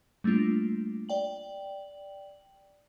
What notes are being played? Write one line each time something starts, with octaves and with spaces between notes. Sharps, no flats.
G3 A3 A#3 D4 F4
D5 G5 F#7